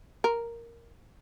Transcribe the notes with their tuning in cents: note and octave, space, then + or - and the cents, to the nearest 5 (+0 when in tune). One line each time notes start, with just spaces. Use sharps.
A#4 +0